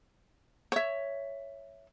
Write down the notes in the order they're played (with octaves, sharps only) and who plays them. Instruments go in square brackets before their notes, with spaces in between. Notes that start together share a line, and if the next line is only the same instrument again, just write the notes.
[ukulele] C#5 E5